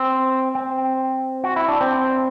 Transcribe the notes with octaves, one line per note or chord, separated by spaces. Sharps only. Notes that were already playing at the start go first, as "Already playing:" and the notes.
Already playing: C4
C4
F#4
E4
D4
C4